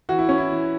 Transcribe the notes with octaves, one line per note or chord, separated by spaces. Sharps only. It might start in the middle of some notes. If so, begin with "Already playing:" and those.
E3 F#4
E4
C#4
E4
E3